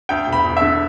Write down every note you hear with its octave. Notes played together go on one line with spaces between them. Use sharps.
D2 G5
E1
B5
E1
D3 E5